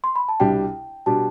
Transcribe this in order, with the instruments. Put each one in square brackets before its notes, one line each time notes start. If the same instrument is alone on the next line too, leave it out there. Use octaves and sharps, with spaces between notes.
[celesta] C6
B5
A5
[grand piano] C2 B2 G3 D4 G4 [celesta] G5
[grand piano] B2 G3 D4 G4 [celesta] A5